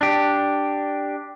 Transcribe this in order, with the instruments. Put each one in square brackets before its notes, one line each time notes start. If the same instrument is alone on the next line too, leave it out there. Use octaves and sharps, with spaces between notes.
[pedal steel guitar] D4 G4